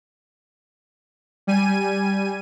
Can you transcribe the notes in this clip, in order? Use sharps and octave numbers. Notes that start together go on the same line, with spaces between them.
G3 G#5 D#7